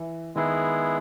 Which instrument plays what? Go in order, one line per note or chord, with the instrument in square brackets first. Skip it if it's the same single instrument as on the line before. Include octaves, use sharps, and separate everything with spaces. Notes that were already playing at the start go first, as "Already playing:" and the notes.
Already playing: [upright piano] E3
[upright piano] D#3 [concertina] G#3 B3 E4 G#4